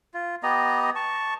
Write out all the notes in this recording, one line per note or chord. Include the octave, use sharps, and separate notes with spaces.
F4
B3 G4 D#5 A#5
A5 C#6